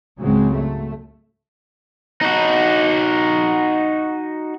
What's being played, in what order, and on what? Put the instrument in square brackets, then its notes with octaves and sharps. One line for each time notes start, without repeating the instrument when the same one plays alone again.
[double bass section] C#2 G#2 C#3 F#3 G#3 C4
A3
[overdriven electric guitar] D#4 F#4